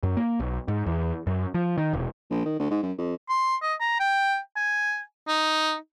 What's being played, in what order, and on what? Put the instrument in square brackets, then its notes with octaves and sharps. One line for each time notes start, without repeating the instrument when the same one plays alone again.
[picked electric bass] F#2
A#3
B1
G#2
E2
F#2
F3
D#3
E1
[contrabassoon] A#1
D#3
D2
G#2
F#2
F2
[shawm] C6
D#5
A#5
G5
G#5
D#4